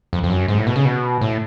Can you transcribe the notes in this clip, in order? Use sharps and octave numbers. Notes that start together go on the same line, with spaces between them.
F2
F2
F#2
G#2
A2
B2
C#3
B2
A2